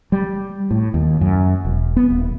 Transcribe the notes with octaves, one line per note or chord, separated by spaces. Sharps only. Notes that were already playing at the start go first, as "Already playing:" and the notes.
G3
A2
D#2
F#2
E1
B3
D#1